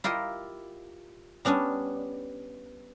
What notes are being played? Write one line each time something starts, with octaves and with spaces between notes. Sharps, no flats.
E4 F4 G4 A#4 D#5
G3 B3 C#4 D4